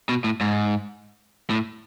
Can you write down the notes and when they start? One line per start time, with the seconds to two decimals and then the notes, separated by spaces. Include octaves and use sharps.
0.09 B2
0.24 A2
0.41 G#2
1.50 A2